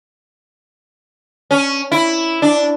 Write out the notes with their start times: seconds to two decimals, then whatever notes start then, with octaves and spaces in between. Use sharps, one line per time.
1.51 C#4
1.92 E4
2.42 D4